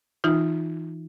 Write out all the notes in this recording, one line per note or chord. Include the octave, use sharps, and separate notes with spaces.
E3 D#4 F4